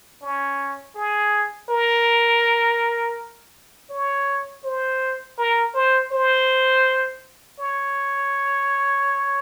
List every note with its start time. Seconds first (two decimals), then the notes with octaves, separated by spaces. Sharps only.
0.22 C#4
0.95 G#4
1.69 A#4
3.90 C#5
4.64 C5
5.38 A#4
5.74 C5
6.12 C5
7.59 C#5